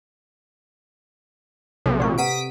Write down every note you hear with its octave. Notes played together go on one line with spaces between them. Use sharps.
B1 C3 A4
A1 A#2 D5 C#6
B4 F#5 A#5 D#6 B6 D7